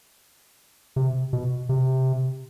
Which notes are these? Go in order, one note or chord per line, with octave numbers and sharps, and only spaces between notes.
C3
B2
C3